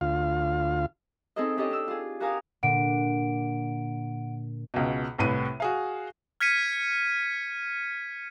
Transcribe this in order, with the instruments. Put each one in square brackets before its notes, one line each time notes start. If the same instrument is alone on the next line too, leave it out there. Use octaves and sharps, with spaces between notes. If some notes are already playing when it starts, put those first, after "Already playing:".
[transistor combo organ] D2 F4 F5
[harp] C4 D#4 G#4 A4 D#5
C#4 D4 G4 A4 D#5 A5
D4 E6
F4 G#4
F#4 G4 A#4 F5 G#5 D#6
[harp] A#2 D3 [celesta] F#5 D7
[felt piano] C#2 B2
C2 A2 B4 D#7
F#4 G#4 F5
[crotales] F6 G#6 B6 C#7 D#7